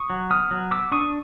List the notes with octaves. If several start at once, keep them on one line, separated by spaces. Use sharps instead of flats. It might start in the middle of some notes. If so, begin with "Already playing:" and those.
Already playing: C#6 D#6
F#3
B3 D#6 F6
F#3
B3 D6 E6
D4 C#6 D#6